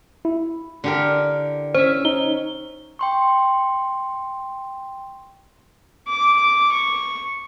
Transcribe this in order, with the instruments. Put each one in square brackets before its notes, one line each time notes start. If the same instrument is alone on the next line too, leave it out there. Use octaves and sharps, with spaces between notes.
[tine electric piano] E4
[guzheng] D3 G4 A#4
[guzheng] C#4 E5 [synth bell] C5
[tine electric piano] D#4 [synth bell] G7
[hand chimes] G5 C6 C#6
[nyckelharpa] D6
C#6